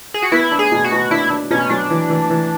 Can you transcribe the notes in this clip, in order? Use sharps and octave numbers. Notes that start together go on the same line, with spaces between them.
G#4
F#4
B3 E4
D4
G#4
B2
F#4
B2
D4 E4
D4
B2 C#4
F#3 D4
E3
E3
E3